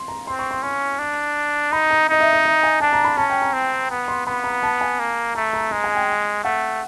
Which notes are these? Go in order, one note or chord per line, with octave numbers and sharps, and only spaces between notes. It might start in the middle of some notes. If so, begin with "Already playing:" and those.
Already playing: C6
A#5
C4 C6
C#6
C6
C#4 C#6
D4
D#4 B5
A#5
D#4 D#5
E5
D#5
E5
G#5
D4 A5
A#5
B5
C#4 A5
G5
A#5
C4
B3
C6
B3 B5
A#5
A5
G#5
A#3
A3 A#5
A#5
G#3 A#5
G#5
G5
A3 F#5